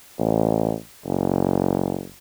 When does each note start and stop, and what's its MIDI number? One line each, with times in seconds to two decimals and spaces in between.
0.19 0.74 33
1.05 2.06 30